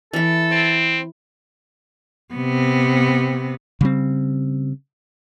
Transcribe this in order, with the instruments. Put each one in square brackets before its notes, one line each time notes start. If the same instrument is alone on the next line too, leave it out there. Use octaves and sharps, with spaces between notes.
[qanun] E3 E4 [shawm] A4
[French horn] C4
[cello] C3 B3
[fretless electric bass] C#3 G3 C4